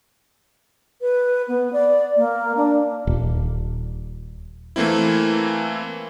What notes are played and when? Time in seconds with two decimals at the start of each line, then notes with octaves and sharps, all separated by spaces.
1.01 B4
1.48 B3
1.73 D5
2.17 A#3
2.57 D4
3.07 D#1
4.76 E3 A3 A#3 C4 E4